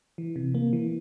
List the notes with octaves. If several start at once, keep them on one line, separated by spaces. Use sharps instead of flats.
E3
C3
A#3
E3